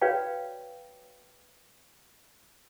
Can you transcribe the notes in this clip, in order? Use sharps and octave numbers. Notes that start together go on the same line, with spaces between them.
F#4 B4 C#5 D5 F5 G5